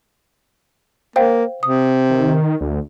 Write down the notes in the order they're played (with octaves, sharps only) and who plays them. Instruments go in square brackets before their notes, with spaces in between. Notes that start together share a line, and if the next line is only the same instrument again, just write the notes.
[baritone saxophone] A#3 [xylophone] C5 F5 G5
[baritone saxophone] C3 [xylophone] D#6
[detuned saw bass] D#3
D2